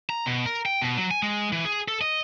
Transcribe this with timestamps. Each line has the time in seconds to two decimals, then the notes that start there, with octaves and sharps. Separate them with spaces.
0.10 A#5
0.26 B2
0.46 A#4
0.66 G5
0.82 B2
0.97 F#3
1.11 G#5
1.22 G#3
1.52 E3
1.65 G#4
1.88 A4
2.01 D#5